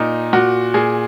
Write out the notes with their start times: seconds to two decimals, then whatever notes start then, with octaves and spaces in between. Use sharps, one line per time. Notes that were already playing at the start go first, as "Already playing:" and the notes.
Already playing: A#2 D#4
0.33 A#2 F#4
0.74 A#2 G#4